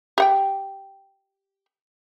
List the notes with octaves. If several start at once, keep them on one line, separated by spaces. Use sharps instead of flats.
G4 F#5 G5